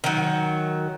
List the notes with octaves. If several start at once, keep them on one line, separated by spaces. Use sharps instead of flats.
D#3 F#3